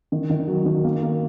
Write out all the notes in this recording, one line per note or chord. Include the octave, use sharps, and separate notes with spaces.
D#3
D#3
F#3
D#3
A#3
A#3